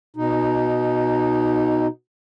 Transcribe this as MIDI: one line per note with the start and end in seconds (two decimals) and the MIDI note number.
0.16 1.87 47
0.16 1.87 63